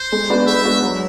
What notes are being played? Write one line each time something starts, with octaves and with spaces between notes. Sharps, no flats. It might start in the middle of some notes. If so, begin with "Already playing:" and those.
Already playing: C5
G#3
B3 D4 F#4 B4
G#3 E5
B3 D4 F#4 B4
F#3